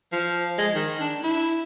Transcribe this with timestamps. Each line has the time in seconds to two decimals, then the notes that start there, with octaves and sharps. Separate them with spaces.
0.12 F3
0.58 G#3
0.75 D#3
1.00 D4
1.23 E4